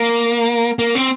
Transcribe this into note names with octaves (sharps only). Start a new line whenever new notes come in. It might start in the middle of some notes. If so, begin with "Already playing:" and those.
Already playing: A#3
A#3
C4